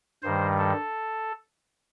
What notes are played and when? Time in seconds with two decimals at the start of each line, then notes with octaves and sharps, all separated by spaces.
0.23 G2 D#3 G3 C5
0.58 A4